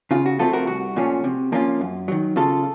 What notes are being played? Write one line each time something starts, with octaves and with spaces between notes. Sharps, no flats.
C#3 F4
F#4
F3 A3 C4 F4 A4
F#4 A#4
C2 F#4
A#2 F3 A3 C#4
C3
F3 A#3 C#4 F4
F#2
D#3 F#3
C#3 F4 A4